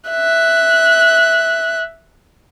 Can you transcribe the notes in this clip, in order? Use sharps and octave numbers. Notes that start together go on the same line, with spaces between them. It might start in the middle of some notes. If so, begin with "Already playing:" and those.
E5 F#6